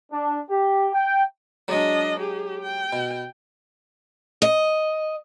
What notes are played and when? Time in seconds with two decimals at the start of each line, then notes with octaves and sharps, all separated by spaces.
0.11 D4
0.49 G4
0.93 G5
1.68 F#3 G#3 D4 D#5
2.19 G4 G#4
2.62 G5
2.93 B2
4.42 D#5